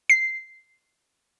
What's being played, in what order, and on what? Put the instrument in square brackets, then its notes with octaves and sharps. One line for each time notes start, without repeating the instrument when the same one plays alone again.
[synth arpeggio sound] C7